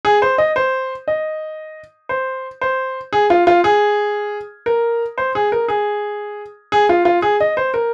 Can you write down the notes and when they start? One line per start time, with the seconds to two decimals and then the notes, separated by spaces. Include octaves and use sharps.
0.05 G#4
0.22 C5
0.38 D#5
0.56 C5
1.08 D#5
2.09 C5
2.61 C5
3.13 G#4
3.30 F4
3.47 F4
3.64 G#4
4.66 A#4
5.18 C5
5.35 G#4
5.52 A#4
5.68 G#4
6.72 G#4
6.89 F4
7.05 F4
7.22 G#4
7.40 D#5
7.57 C5
7.74 A#4